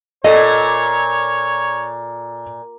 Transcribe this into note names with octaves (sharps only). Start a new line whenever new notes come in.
A#2 A4 C#5 D#5